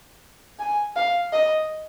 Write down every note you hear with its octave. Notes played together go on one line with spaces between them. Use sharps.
G#5
F5
D#5